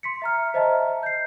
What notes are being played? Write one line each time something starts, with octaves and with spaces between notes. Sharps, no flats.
C6 B6 C#7
E5 A#5 F6
C5 D#5 E5 A5 A#5
G6 C7